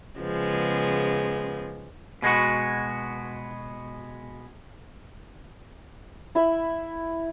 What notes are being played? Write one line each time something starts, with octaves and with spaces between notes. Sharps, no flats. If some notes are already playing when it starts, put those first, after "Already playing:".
C#3 F3 G#3 B3
B2 G#3 B3 F#4
E4 E5 B5